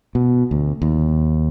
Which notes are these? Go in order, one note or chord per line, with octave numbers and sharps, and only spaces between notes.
B2
D2
D#2